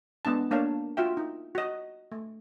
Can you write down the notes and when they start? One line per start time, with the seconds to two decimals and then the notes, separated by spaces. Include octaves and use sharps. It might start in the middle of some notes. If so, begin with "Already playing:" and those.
0.25 G#3 B3 D4 A5
0.51 A#3 D4 C#5 F5 A5
0.97 F4 F#4 E5 G5
1.17 D#4
1.55 F#4 D#5
2.12 A3